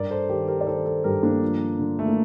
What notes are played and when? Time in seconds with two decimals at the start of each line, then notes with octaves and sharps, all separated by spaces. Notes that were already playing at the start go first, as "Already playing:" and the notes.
Already playing: G2 A#4 D5
0.10 A4 C5
0.29 D#3 G4 A#4
0.48 G4 A#4
0.61 D5
0.67 D#3 A4 C5
0.85 A4 C5
1.04 G2 G4 A#4
1.23 A#3 D4
1.42 F3
1.79 D3
1.99 A3
2.08 A#3